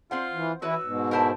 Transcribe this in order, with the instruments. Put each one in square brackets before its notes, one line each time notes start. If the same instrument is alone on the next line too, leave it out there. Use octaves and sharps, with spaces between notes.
[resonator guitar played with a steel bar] C4 C5 F#5 [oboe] F4
[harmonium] E3
[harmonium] E3 E4 [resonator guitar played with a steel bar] F#4 B4 C#5 [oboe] E6
[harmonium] G#2 B2
[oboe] E4 [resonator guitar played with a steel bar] A#4 C5 A5